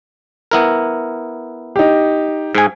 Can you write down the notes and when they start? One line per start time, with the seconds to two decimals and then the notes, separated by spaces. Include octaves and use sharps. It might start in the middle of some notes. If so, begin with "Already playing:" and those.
0.51 B3 E4 A#4
1.76 D#4 G4
2.55 G#2 G#5